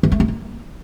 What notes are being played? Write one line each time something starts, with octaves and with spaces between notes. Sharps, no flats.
E3
A3
E4
A#3